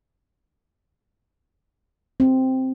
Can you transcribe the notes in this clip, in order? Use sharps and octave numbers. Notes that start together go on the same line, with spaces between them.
C4